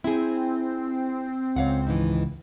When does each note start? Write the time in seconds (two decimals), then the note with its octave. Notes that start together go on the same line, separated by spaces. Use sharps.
0.04 C4 E4 G#4
1.56 C#2 C#5 F5 F#5
1.87 G#2 D#3 E3